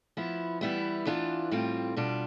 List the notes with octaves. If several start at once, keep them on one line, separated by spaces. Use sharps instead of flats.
F3 B3 E4
E3 G3 B3 E4
E3 B3 D4 F4
A2 G3 C4 F4
B2 G3 D4 F4